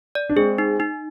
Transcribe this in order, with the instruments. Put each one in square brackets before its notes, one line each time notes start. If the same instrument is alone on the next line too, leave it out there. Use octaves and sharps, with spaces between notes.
[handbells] D5
[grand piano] D4
[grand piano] G#3 C4 [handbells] G#4
[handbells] D#4
D#4